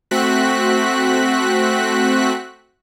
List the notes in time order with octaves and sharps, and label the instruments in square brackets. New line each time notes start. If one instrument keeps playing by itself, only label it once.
[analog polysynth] A3 C4 F#4 F#6 B6